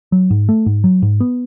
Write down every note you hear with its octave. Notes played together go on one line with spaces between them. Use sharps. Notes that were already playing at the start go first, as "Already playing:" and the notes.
F#3
G#2
A3
G#2
F#3
G#2
B3